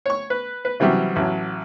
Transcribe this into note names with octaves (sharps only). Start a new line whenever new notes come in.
C#5 C#6
B4
B4
C3 E3 F#3 G3 C#4
A1 F#3